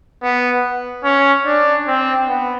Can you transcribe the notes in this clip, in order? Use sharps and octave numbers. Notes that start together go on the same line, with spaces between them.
B3
C#4
D4
C4
B3